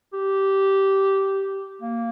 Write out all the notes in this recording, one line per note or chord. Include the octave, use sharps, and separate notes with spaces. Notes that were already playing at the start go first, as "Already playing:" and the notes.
G4
A#3